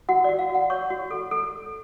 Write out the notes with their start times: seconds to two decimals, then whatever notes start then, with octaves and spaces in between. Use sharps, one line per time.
0.09 F#4 F#5
0.24 F#4 D5
0.39 F5
0.49 F#4
0.55 F#5
0.70 C#5 C#6
0.90 F#4
1.11 A4
1.31 A4